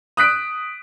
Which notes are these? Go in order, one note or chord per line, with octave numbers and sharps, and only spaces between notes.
D#6 F#6 B6 D7